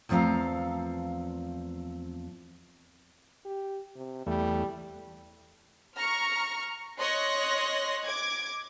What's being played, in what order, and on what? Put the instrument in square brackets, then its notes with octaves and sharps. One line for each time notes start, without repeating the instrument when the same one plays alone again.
[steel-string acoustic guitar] E2 F3 A3 C4 F5 A#5
[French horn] G4
C3
[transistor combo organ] E2 A3 [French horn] G3
[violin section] A#5 C#6 F6
C#5 D#5 C6 F#6 A#6
D6 G#6